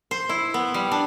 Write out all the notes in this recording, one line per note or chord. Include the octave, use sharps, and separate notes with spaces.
C5
E4
B3
G3
D4